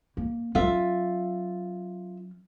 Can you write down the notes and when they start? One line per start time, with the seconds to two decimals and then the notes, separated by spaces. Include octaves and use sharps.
0.17 A#3
0.55 F#3 C#4 F4 E5